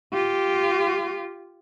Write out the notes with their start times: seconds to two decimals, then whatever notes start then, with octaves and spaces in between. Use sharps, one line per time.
0.13 F4 G4